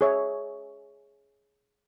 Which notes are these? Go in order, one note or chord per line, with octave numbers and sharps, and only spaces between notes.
G#4 C#5 E5